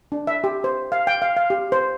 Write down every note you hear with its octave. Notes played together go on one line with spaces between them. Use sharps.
D4
E5
G4
C5
F5
G5
F5
F5
G4
C5